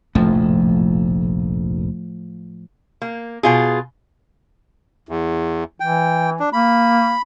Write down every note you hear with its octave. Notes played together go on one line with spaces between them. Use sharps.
F1 A#1 F2 A2 F3
A#3
B2 F4 G#4
E2
E3 G5
D4
A#3 B5